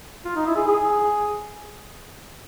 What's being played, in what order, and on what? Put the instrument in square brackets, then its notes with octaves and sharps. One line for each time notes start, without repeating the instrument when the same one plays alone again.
[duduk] F4
D#4
E4
G#4
G#4